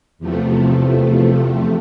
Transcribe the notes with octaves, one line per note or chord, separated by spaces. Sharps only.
E2 C3 F3 A3